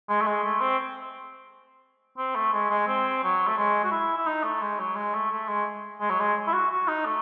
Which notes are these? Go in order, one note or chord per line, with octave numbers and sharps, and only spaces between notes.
G#3
A3
G#3
A3
C4
C4
A3
G#3
G#3
C4
F#3
A3
G#3
F#4
E4
E4
D#4
A3
G#3
F#3
G#3
A3
A3
G#3
G#3
F#3
G#3
E4
F#4
F#4
D#4
A3